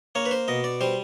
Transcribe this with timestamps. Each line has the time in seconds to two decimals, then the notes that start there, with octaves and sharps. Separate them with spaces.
0.15 A#3 C#5
0.25 B4
0.31 C5
0.48 B2 D#5
0.64 D5
0.81 G3 C5